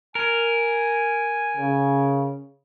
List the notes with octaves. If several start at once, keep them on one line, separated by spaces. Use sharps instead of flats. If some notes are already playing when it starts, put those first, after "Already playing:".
A#4 G#5
C#3